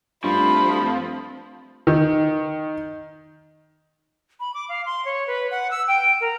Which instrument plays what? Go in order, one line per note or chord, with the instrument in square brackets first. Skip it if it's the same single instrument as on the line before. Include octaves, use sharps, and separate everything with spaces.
[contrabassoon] G2 [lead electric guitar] F3 [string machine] A3 C4 [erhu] B5
[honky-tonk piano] D#3
[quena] B5
D6
F5
C6
C#5
B4
F#5
E6
G5
A#4